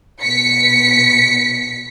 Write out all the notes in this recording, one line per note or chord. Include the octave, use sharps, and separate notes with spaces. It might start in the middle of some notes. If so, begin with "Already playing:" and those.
B2 B6 C#7